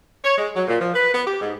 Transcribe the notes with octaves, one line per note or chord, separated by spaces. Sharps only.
C#5
G#3
F#3
A#2
F3
B4
B3
G4
G#2